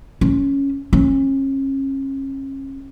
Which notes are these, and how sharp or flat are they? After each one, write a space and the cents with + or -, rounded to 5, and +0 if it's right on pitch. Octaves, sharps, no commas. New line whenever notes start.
C#4 +0
C#4 -35